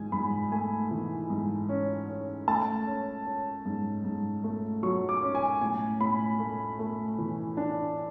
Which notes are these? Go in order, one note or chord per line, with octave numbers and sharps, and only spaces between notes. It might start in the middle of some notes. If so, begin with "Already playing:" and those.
Already playing: G#2 E3 G#5
G#2 B5
A3 G#5
E3
G#2
C#4
C#4
A3 A5
C#4
C#4
G#2
G#2
A3
F#3 C#6
D6
C#4
G#5
A2 G#5
A2 B5
A3
A3
E3
D4